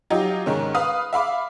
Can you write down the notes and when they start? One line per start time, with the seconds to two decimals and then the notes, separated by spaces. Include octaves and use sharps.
0.10 F#3 D#4 F4 G4
0.46 G#2 D#3 C#4
0.75 B4 F5 B5 D#6 F6
1.13 E5 F5 B5 D6